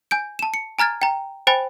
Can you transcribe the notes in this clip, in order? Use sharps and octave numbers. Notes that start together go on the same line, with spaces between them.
G#5 G6 D7
A5 E7
C#7
G#5 A#5 F6 G#6 A6
G5 A#5
C5 G5 G#5 B5 A6